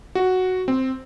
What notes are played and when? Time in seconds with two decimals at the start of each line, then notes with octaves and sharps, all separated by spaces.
0.15 F#4
0.68 C4